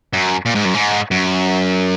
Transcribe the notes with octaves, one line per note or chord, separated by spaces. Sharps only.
F#2
A#2
G#2
F#2
G#2
F#2